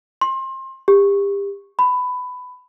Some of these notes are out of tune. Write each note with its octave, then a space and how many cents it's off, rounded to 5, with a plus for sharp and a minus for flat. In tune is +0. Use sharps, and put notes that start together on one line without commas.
C6 +25
G4 +30
B5 +15